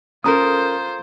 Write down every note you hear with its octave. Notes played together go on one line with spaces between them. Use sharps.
C#4 F4 A4 A#4 C5 A#5 D#6